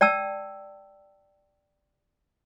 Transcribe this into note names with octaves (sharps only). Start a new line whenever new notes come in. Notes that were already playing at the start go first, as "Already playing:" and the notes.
D5 G5 A5 E6